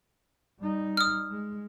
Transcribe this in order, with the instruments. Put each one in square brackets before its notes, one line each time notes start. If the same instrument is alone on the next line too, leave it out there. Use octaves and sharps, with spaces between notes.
[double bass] G3 D#4
[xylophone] D#6 F6
[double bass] G#3